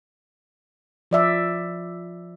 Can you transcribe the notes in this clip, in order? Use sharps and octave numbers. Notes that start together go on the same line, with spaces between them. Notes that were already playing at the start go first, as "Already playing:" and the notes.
F3 D5 E5